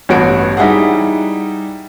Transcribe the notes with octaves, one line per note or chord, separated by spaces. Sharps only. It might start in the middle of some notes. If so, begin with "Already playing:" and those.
A1 G2 B3 F#4 C#5 D7
G3 D#4 E4 G#4 F#5